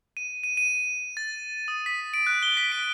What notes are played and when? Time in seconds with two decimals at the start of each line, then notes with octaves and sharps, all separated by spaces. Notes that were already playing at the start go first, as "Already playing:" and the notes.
0.17 D#7
0.44 D#7
0.57 D#7
1.17 A6
1.68 D#6
1.86 B6
2.14 D7
2.27 F#6
2.43 G7
2.57 B6
2.72 D7